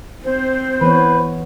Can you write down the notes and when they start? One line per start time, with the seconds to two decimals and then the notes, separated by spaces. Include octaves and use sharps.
0.24 C4 C5
0.81 E3 B3 B4 C#5